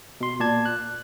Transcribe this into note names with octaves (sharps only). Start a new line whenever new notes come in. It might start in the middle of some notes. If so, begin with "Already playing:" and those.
B2 C6
A#2 D5 A5 G#6
F#6